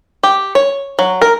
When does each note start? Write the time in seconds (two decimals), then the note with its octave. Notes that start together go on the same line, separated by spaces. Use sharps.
0.23 G4
0.55 C#5
0.99 F#3
1.21 A#4